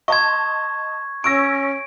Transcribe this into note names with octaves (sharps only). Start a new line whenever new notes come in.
D#5 A5 C6 C#6 G#6
C#4 C#6 E6 A#6 D7